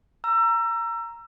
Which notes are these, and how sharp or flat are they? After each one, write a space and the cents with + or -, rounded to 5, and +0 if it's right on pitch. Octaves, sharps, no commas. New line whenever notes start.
A#5 +0 E6 +30